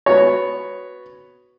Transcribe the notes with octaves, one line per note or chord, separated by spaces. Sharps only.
B3 F#4 C#5